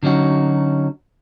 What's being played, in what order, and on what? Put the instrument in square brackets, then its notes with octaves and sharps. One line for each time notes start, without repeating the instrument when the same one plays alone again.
[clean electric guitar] D3 F#3 C#4 D#4 F#4